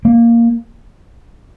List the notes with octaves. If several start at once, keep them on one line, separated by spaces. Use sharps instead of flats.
A#3